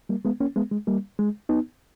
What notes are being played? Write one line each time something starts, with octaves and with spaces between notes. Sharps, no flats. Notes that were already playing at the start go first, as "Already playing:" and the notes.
G3 A#3
G#3 B3
A#3 C#4
G#3 B3
G#3
G3 A#3
G#3
B3 D#4